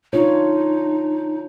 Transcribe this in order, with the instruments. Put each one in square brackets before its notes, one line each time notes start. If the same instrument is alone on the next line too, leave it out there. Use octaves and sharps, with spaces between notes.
[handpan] D4 F4 C#5 [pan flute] D#4